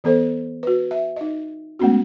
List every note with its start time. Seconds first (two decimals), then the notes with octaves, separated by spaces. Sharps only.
0.04 E3 B3 A4 C5
0.63 F#4 B4
0.91 E5
1.16 D#4 D#5
1.79 G#3 A3 B3 C#4 F#4